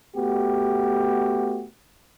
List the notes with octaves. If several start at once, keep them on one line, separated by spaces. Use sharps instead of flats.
A3 B3 F#4 G4